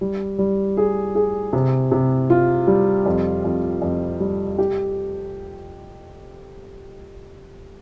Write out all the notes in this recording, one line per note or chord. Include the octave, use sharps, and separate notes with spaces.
G3
G3
G#4
G#4
C3
C3
F4
G3
F2
F2
F2
G3
G4